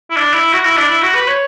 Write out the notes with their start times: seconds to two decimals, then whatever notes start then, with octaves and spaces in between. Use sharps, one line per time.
0.10 E4
0.17 D4
0.34 E4
0.53 F#4
0.65 E4
0.78 D4
0.90 E4
1.03 F#4
1.15 B4
1.28 C#5